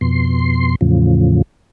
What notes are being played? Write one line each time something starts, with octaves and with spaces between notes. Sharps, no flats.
F2 B2 C6
E2 A2 C#3 F3